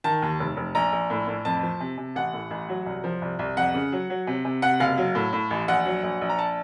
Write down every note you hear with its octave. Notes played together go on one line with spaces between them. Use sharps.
D#3 A5
D#2
F1
F1
A#1 A#5
A#1
A2
A2
F2 A5
F3
C3
C3
A1 F#5
A2
A1
F#3
C2
F3
C2
C2
F2 F#5
C#3
F#3
F#3
C3
C3
C3 F#5
F#1 F5
F#3
A2
A2
A1
A#1 F#5
F#3
A#1
A#1
A#5
A5